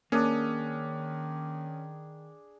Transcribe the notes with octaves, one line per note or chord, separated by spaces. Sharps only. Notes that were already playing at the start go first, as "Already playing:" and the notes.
D#3 A#3 C#4 D4 G#4 D#6